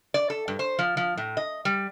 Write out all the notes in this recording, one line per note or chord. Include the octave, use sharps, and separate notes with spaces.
D5
A4
G2
C5
F3
F3
A2
D#5
G3